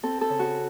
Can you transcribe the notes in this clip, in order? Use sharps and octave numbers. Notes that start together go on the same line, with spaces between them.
C4 A4
A4
C#3
F#4